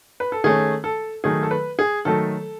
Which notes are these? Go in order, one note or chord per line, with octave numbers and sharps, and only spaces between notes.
B4
A4
D#3 A3 C#4 G#4
A4
D#3 F#3 A3 G#4
A4
B4
G#4
D#3 F#3 A3 A4